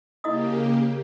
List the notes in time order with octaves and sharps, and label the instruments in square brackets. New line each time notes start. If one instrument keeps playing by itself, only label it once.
[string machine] C#3 A#3 G4 [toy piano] E4 D#5 D#6